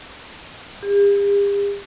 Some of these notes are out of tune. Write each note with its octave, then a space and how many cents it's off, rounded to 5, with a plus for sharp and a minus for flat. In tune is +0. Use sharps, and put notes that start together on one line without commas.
G4 +45